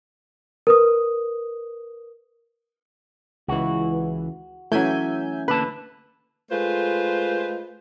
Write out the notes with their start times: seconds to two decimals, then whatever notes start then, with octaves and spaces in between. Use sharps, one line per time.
0.67 A#4 B4 D#6
3.48 C#2 E3 F#4
4.72 E3 F#3 A3 C#4 E5 G#5 G6
5.48 D3 A#3 B4 A5
6.51 G#3 A3 F4 B4 C5